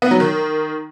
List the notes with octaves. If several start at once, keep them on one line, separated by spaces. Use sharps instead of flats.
B3
F#3
D#3